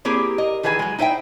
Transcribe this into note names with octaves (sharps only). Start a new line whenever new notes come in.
A#3 C4 E4 G4 G#4 A#4
A#4 D#5
D#3 E3 G#4 B4 C5 G#5
F#3 G#3
D#4 E4 C5 E5 G5